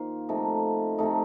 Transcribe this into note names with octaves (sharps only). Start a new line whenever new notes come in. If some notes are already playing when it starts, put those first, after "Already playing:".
Already playing: D#3 A#3 F4 C5
C3 F3 A3 D#4
C3 F3 A3 D#4